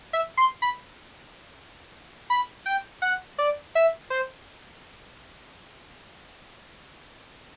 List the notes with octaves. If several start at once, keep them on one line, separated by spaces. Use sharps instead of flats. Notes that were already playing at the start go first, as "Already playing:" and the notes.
E5
C6
B5
B5
G5
F#5
D5
E5
C5